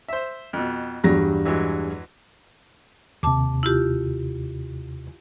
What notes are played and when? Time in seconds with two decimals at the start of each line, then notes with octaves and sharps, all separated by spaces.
0.08 C5 E5
0.53 F2 B2
1.04 E2 G2 F#3 G3 A#6
1.45 E3 F#3 G#3
3.23 D#2 C3 A5 D6
3.63 E4 F4 G4